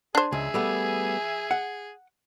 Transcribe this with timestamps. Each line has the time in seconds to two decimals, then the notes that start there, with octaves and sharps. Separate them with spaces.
0.15 D4 G#4 C5
0.32 C#2 G#4 E5 G#5
0.54 G3 A3 B3
1.51 F#5